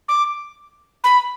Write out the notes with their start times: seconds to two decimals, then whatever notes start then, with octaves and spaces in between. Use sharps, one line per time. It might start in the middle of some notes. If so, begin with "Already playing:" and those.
0.09 D6
1.04 B5